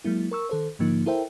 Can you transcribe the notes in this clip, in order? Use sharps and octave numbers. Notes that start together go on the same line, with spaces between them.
F#3 G#3 A#3 E4
A#4 C#6 E6
D#3 A4 C5
G#2 D3 F3 A#3 D#4
E4 A4 A#4 C5 E5 G5